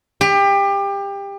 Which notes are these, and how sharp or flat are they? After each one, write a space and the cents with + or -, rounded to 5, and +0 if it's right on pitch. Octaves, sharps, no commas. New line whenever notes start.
G4 +25